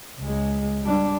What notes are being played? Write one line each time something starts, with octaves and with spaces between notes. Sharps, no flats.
C#2 G#3
G3 D4